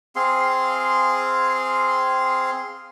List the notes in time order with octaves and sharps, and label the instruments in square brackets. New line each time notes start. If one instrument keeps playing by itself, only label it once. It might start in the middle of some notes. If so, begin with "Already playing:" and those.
[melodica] C4 G#4 F5 C6